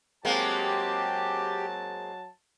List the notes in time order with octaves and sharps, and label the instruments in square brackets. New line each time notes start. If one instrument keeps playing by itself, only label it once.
[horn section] F#3 A5 [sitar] G#3 A#3 C4 [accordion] G4